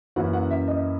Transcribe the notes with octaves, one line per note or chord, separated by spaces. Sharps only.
F#2 E3 A#3 C#4 E4 F#5
F#5
E5
D#5